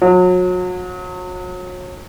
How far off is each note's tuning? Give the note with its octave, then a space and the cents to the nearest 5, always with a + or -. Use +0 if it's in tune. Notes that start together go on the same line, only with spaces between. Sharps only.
F#3 -35